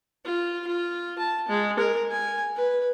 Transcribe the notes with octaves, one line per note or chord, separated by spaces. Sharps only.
F4
F4
A5
G#3
A#4
G#5
B4